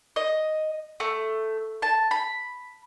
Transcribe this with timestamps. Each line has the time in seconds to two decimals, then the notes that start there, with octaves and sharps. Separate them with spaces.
0.16 D#5
1.00 A3
1.82 A5
2.11 B5